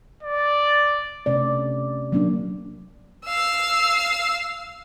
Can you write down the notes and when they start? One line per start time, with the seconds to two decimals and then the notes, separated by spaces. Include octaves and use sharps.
0.23 D5
1.26 C3 A3 C#4 D5
2.12 F#3 A#3 C#4 D4
3.26 F5 E6